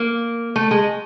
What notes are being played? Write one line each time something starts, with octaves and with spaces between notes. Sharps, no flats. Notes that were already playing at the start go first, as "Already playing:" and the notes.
Already playing: A#3
A3
G#3